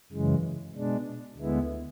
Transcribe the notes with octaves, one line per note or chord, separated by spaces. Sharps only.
F#2 C#3 E3 G#3
B2 G#3 D4
D2 D3 G#3 B3 E4